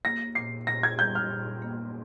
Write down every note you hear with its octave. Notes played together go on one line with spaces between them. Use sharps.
A#3 A#6
A#2 C7
A#2 A#6
G#6
G3 G6
F6
A#2
A#3